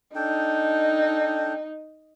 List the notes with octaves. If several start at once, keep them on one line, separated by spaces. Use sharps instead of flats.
D4 D#4 A4 G5